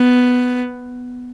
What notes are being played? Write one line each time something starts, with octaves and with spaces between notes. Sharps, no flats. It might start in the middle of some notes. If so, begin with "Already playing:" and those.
Already playing: B3